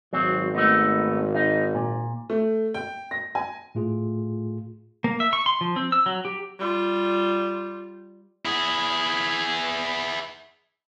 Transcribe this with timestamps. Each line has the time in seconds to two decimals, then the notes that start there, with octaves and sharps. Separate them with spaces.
0.13 G#1 F#3 C4
0.55 A3 B3 D#4
1.35 D#4
1.74 A#2
2.30 A3
2.74 G5
3.11 A#6
3.35 G#5
3.75 A2 A3 F4 G#4
5.04 A#3
5.20 E5
5.33 C#6
5.46 C6
5.61 F3
5.76 C4
5.92 E6
6.06 F#3
6.25 G4
6.59 G3 F4
8.45 E4 G#4